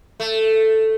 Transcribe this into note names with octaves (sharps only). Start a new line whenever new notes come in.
A3